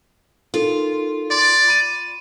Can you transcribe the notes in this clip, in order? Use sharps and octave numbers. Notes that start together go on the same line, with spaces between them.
D#4 F4 A4 A#4
D5 C6
B5 D#7